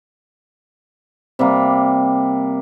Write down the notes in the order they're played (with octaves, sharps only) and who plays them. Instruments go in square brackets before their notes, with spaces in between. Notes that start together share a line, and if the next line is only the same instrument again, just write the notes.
[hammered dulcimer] C3 G3 A#3